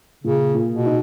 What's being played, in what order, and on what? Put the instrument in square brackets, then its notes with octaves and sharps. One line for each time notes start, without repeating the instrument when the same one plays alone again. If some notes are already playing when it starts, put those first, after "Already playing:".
[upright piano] A#2 [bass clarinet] C#3
[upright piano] A#2
[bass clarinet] B2
[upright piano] D#4